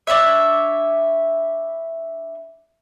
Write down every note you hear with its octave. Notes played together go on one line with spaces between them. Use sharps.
D4 E4 C#5 E5